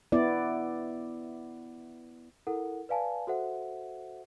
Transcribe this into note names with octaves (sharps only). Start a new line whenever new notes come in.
B3 E4 D5
E4 A4 A#4 F#5
B4 D5 F5 G#5 A5
F#4 A4 C5 E5 F#5